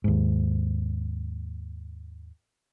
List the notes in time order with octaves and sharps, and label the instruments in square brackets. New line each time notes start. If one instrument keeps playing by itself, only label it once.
[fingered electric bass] D#2 G#2